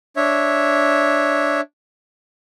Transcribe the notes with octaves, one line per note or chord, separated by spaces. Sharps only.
D4 C#5 E5